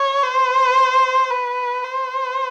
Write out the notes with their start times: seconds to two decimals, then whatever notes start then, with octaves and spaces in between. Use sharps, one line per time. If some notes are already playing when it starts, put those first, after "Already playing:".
Already playing: C#5
0.23 C5
1.30 B4
1.84 C5